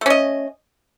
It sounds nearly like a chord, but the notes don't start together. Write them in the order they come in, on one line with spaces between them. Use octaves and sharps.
A3 C#4 D#5